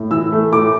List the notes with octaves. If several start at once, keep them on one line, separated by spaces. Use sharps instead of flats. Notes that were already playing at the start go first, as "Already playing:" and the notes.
Already playing: A2
E3 E6
A3
A2 D6